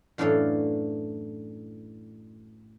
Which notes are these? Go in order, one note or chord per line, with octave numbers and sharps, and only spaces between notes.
F#2 A2 E3 D4 A4 F5